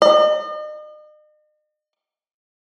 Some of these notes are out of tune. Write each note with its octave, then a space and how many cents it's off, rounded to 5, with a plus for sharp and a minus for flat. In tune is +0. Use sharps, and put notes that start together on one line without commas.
D#5 -40